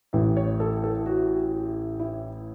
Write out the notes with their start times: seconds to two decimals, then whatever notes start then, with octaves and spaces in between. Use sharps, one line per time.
0.13 A1 A2 E3 E5
0.37 C#5
0.60 A4
0.84 A4
1.06 F#4
2.00 E4